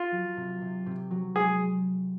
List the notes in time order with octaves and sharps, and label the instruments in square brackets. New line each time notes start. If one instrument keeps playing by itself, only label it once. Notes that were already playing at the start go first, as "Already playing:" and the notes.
Already playing: [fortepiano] F4
[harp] F#3
C3
C3
C3
F#3
[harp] G#3 [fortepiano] G#4